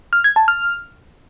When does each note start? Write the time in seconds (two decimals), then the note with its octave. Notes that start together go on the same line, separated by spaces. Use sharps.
0.13 F6
0.24 G#6
0.36 A5
0.48 F6